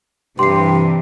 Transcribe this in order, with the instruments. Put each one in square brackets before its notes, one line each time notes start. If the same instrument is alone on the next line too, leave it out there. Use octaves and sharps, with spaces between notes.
[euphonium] G2 [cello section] C3 E3 [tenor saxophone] G4 [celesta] C6 C7